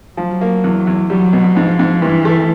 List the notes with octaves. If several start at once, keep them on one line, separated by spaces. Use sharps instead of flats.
F3 F#3
A#3
E2
E2
F#3 G3
B2
G#2 F3
G#2
G2 E3
A3